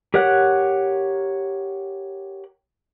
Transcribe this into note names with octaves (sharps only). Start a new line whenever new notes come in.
G4 A#4 C#5 F#5 F#6